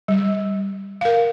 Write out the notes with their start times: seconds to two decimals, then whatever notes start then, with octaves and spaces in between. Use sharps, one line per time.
0.08 G3
1.01 A#4 F5